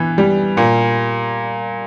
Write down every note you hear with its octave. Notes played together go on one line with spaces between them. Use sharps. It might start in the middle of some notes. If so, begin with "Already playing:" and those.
Already playing: E3 B3
G3
A#2